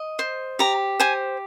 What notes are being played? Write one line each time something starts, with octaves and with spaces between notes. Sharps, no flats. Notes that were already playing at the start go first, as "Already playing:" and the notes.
Already playing: D#5
C5
G4 A#5
C5 G#5